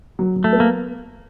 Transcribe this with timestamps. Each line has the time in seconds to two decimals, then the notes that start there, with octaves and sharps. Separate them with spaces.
0.19 F#3
0.36 F#3
0.44 A3
0.53 B3
0.60 A#3